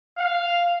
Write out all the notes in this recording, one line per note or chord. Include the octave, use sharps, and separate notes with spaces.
F5